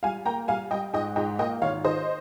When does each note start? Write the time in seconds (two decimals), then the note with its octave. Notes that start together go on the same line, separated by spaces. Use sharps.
0.03 G3 F5 G#5
0.26 A#3 G5 A#5
0.48 G3 F5 G#5
0.71 G3 D#5 G5
0.93 G#2 D#5 G5
1.16 G#2 D#5 G5
1.39 A#3 D#5 G5
1.61 G#1 C#5 F5
1.84 D#3 C5 D#5